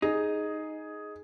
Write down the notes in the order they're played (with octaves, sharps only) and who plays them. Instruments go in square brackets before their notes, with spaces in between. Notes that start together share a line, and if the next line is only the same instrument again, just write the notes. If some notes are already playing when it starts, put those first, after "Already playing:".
[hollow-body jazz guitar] D#4 [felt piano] G#4